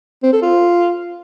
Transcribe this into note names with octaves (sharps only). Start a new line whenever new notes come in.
C4
A4
F4